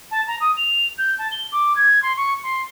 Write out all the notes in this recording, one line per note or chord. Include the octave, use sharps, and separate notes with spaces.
A5
A#5
D#6
F7
G6
A5
G7
D6
G#6
C6
C#6
C6